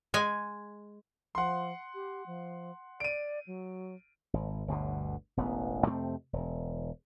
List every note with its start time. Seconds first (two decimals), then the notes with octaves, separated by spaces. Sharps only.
0.14 G#3 G#5
1.35 F3 F#5 C6
1.94 G4
2.26 F3
3.00 D5 D7 D#7
3.47 F#3
4.33 G#1
4.68 G1 D2 B2 D3
5.37 E1 A1 B3
5.86 F2 C3 A3 C4
6.33 E1